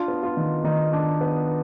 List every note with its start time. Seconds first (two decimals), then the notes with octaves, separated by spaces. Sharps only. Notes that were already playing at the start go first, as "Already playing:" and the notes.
Already playing: D4 F4
0.08 B3
0.23 F4
0.37 D#3
0.64 D#3 D#4
0.93 D4
1.21 B3